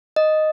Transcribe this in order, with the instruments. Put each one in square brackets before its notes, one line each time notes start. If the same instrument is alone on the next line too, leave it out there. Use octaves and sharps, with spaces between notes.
[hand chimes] D#5